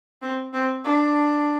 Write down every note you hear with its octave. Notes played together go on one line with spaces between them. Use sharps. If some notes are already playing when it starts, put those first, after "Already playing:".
C4
C4
D4